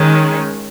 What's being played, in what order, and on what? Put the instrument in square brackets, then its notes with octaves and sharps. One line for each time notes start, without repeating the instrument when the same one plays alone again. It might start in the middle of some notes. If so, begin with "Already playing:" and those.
Already playing: [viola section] D#3 G#3 C#4